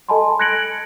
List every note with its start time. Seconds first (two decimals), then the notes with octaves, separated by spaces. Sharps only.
0.09 A4 D#5 G#5 A5 B5 C6
0.39 F#6 G#6 A#6 C#7 D7 F#7